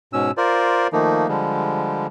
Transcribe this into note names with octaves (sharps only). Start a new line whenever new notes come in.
G#2 B2 C#4 E6
F4 A#4 C5 D5
D#3 F3 A3 A#3 D#4
D3 F3 G3 G#3